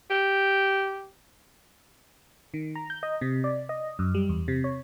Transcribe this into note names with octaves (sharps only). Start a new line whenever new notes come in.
G4
D#3
A#5
G6
D#5
C3
D5
D#5
F#2
G3
E2
C3
C#5